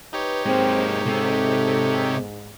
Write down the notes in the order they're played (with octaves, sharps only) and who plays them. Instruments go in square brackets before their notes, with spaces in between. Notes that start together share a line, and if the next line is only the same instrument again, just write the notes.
[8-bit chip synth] D#4 G4 C#5 [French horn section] B4
[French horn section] G#2 [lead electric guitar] G#3 A#3 [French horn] C4
[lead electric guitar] C3 C4 [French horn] A4